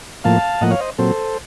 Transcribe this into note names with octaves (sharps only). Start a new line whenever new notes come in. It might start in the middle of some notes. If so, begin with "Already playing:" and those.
A2 F3 A#3 F5 A5
A2 F3 A#3 D#5 F#5
C#5 F5
C5 D#5
A#2 F#3 C4 A4 C5